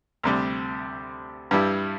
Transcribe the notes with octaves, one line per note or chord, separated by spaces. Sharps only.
D2 C3 G3
G2 G3 E4